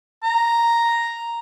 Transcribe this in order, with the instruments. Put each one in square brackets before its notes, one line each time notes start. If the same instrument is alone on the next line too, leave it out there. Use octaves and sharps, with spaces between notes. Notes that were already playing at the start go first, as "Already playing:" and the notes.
[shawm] A#5